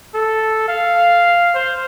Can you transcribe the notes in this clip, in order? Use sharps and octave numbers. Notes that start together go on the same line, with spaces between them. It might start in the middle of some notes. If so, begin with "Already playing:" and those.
A4
F5
C5